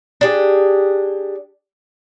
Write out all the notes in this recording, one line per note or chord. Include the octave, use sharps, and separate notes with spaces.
D4 G4 G#4